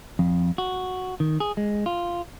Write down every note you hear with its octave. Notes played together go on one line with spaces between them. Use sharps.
F2
F#4
D#3
G#4
G#3
F4